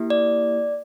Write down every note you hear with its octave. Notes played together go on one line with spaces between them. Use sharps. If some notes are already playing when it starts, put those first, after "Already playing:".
Already playing: A#3 E4 G4
D5